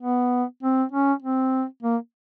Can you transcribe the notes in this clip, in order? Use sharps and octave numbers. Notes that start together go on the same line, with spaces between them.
B3
C4
C#4
C4
A#3